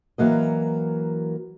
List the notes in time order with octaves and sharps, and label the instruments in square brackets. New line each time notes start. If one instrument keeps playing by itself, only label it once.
[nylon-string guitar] E3 F#3 A#3 D#5